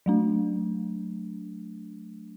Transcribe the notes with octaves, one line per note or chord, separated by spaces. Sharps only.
F#3 A3 D4